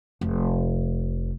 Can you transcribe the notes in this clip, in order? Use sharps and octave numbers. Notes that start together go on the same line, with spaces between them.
F1